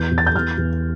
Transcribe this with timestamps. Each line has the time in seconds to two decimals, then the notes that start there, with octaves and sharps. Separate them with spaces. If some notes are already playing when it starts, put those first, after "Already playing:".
Already playing: E2 G6
0.11 E2
0.18 A6
0.27 G6
0.35 E2 F6
0.58 E2